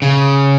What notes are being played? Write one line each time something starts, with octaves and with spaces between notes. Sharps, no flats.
C#3